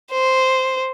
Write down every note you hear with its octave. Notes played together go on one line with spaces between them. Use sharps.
C5